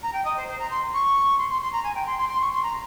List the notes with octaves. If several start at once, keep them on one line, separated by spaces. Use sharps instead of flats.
A#5
G5
D#5
C5
C5
A#5
C6
C#6
C6
C6
C6
A#5
G#5
G5
C6
C6
C6
C#6
C6
A#5